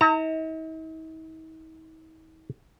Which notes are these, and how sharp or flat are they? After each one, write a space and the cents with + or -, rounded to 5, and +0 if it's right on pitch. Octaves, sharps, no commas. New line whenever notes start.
D#4 +45 A#5 -25